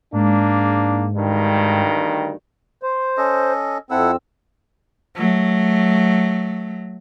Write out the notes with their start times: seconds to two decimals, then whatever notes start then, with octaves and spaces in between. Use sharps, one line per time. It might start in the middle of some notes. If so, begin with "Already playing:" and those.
0.13 G#2 A#3 D4
1.16 D2 G2 D#3
2.83 C5
3.17 C#4 A4 D#5
3.91 F2 C4 E4 A4 F#5 E6
5.15 F#3 A3